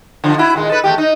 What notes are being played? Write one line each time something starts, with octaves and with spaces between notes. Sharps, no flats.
D3 F3
E4 F#4
D#2 A#2 G#3
A4 B4
E2 A3 G4
D#4